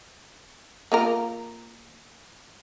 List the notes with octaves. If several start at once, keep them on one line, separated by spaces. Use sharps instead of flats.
A#3 F4 A#4